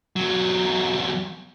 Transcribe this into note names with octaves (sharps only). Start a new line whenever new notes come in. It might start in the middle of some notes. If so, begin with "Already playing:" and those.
E2 F#3